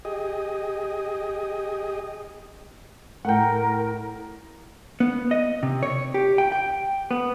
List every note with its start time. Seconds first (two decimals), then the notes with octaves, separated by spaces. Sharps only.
0.05 G4 G#4 D#5
3.25 A2 A3 A#4 F#5 G5
5.00 B3
5.31 D#5
5.63 C3
5.83 C#5
6.14 G4
6.38 G5
6.52 G5
7.11 B3